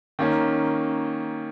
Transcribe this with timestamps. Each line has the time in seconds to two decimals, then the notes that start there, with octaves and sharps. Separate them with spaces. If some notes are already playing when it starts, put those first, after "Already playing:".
0.19 D#3 A#3 C#4